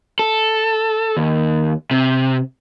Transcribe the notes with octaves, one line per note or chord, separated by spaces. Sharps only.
A4
D#2
C3